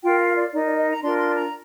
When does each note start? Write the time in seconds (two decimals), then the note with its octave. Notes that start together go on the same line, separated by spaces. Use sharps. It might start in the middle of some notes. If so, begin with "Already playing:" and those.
0.03 F4 A#4 G5
0.19 F5
0.36 D5
0.52 D#4 A#4 D5
0.66 D5
0.77 D#5
0.90 A#5
1.03 D4 F4 A#4 C6
1.19 C6
1.36 A#5